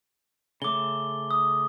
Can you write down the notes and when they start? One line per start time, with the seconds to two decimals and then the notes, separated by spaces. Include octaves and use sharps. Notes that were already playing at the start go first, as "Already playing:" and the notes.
0.62 C#3 A3 D6 G7
1.31 D#6